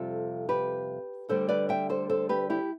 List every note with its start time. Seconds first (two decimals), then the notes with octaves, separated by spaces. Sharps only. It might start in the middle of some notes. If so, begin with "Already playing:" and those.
Already playing: F2 C3 G3 F4 A4
0.49 G4 B4
1.29 D2 D3 G3 A4 C5
1.49 B4 D5
1.69 E5 G5
1.89 A4 C5
2.10 A4 C5
2.29 G4 B4
2.50 E4 G4